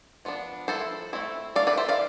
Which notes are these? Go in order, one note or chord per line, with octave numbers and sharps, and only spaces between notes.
F3 B3 D4
F3 B3 E4 A4 C5
A3 C4 E4
A3 D4 D5 F5
B4 D5
C5 E5
D5 F5